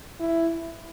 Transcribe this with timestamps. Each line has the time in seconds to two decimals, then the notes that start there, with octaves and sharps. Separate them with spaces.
0.20 E4